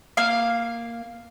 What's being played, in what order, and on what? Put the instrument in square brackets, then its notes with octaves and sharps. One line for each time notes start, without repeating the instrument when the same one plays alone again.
[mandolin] A#3 F5